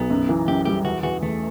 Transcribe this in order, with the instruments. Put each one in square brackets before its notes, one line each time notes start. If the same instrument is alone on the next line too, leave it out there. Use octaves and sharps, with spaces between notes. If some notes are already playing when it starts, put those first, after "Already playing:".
Already playing: [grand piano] B1 [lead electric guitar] B3
[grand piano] F#2
E3
[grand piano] F#2 [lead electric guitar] G4
[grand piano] G3 [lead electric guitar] G4
[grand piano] E2 [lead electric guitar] F#4
[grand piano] E2 [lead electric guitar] F#4
[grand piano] E2 [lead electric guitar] A3